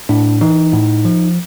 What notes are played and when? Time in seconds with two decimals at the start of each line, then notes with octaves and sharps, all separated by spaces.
0.09 A2 D4
0.41 E3 D#4
0.73 A2
1.05 F3